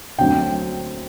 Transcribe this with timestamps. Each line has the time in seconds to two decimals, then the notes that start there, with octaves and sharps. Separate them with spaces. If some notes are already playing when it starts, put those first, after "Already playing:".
0.19 D2 D3 F#3 C4 G5